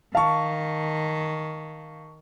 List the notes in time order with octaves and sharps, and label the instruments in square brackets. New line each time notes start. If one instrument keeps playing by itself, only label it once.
[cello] D#3 [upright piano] F5 [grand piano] A5 C#6